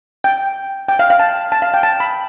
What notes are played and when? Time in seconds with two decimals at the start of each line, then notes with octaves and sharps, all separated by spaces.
0.24 G5
0.88 G5
0.99 F5
1.10 F5
1.20 A5
1.52 A5
1.62 F5
1.74 G5
1.83 A5
2.00 B5